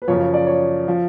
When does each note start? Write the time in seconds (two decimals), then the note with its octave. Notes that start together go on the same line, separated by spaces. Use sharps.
0.02 B4
0.08 F#2 C#3 F3 C#5
0.21 C#5
0.34 D5
0.47 C#5
0.88 F3